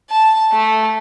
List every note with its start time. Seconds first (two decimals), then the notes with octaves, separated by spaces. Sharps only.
0.11 A5
0.53 A3